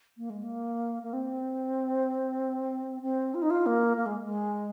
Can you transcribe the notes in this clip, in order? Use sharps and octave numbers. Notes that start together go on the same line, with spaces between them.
A#3
G#3
A#3
A#3
C4
C4
F4
D#4
F4
A#3
A#3
G#3
G#3